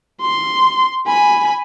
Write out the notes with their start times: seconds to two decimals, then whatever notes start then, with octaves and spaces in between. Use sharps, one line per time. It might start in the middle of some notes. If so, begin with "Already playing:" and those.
0.21 C6
1.07 G#5 B5